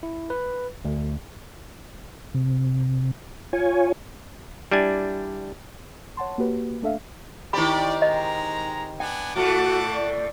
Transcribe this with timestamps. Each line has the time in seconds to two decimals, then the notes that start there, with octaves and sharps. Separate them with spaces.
0.03 E4
0.30 B4
0.85 D2
2.34 C3
3.53 F4 C#5 G#5
4.71 G3 D4 E4 G#5
6.17 C#5 F#5 A5 C6
6.38 A#3 F#4 G4 B4
6.82 A3 D4 A4 E5 F5
7.53 D#3 C4 E4 G4 D5 B5
8.02 G#3 D#5 A#5
9.00 B3 D4 G5 G#5
9.36 A2 A3 F#4 F#5 A5 D6
9.95 D5